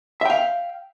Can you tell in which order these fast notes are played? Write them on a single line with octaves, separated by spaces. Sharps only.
E5 G5 F5